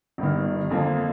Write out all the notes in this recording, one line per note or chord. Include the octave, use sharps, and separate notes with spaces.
G1 G2 D#3
F2 D3 F3 A#3